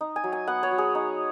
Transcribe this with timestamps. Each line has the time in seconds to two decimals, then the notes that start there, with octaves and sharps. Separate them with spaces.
0.01 D#4
0.16 G#5
0.24 F#3
0.32 G#5
0.47 B3 F#5
0.63 C#5
0.71 F#3
0.78 G#4
0.95 D#4